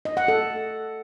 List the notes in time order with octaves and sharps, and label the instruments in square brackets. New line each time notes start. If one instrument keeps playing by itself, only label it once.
[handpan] D#5
F#5
A4